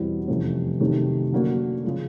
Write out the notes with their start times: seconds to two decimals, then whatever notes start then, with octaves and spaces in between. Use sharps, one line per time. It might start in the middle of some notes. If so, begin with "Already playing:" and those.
Already playing: E2 B2 G3 C4 E4
0.28 F2 C3 E3 A3 C#4
0.80 C3 D#3 F#3 A3 C#4
1.32 D3 F#3 A#3 C#4 F#4
1.84 C#3 F3 G#3